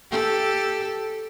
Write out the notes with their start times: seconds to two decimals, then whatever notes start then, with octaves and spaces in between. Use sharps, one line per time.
0.11 G4 A4